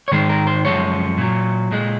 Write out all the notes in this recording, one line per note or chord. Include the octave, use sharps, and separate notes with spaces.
C#5
G#2 D#3 G#3 C5
A#4
C5
F#2 F3 G#3 C#5
A#2 F#3
A#2 G#3